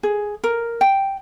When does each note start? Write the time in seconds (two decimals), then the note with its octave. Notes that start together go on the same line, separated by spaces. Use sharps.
0.03 G#4
0.44 A#4
0.81 G5